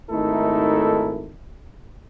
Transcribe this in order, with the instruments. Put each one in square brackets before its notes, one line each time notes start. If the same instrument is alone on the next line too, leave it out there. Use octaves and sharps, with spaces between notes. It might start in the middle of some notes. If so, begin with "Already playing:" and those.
[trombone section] G#1 A3 D#4 E4 A4 A#4